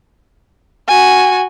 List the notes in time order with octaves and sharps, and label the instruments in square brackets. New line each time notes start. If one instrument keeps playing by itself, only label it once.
[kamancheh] F#4 G#5